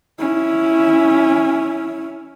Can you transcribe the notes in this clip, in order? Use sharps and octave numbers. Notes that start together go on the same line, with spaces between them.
C#4 E4